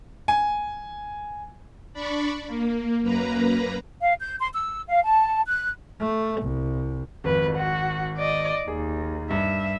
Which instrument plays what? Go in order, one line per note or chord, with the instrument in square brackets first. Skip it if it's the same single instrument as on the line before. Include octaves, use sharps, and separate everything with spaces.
[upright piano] G#5
[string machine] D4 D5 B5 C#6
A#3
F#2 A#3 B4 A#5
[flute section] F5
G6
C6
E6
F5
A5
F#6
[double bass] A3
C2
[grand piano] G#1 [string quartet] F2 B4
[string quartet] F#4
D5 D#5
[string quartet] D#2 [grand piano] G#4
[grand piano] G2 [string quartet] E5